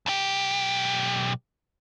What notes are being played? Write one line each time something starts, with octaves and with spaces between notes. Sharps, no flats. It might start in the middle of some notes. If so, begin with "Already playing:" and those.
B1 G4